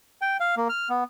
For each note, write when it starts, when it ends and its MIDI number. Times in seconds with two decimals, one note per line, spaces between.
0.22 0.37 79
0.40 0.55 77
0.57 0.68 58
0.69 0.89 89
0.90 1.04 59